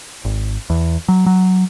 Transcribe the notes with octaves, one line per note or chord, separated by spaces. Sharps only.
G#1
E2
F#3
F#3